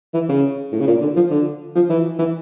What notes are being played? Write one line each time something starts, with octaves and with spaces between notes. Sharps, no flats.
E3
C#3
A2
C#3
A#2
D3
F3
D3
F3
E3
E3